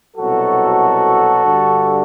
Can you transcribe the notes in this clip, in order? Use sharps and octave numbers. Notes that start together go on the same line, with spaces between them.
C2 B2 F#3 F#4 A4
G2 D3 G3